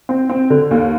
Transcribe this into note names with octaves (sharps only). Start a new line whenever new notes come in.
C4
C4
D3
D#2